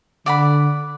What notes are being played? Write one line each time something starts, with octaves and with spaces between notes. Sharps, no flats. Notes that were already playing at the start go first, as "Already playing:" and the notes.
D3 D5 F#5 B5